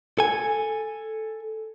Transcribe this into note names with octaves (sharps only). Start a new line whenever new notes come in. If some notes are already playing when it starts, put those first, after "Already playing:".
A4 G#5